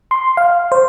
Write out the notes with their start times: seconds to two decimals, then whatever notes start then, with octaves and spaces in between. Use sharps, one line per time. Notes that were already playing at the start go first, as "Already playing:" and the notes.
0.11 C6
0.37 F5
0.72 C5